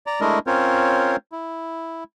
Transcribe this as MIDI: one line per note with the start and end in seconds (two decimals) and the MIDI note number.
0.06 0.21 74
0.06 0.21 82
0.21 0.39 56
0.21 0.39 57
0.21 0.39 62
0.21 0.39 64
0.21 0.39 70
0.21 0.39 75
0.47 1.16 60
0.47 1.16 61
0.47 1.16 65
0.47 1.16 70
0.47 1.16 72
0.47 1.16 73
1.32 2.04 64